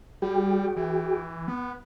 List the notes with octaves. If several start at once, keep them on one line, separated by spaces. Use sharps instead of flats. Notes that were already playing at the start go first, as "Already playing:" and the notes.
G3 F#4 G#4 G5
E3
B3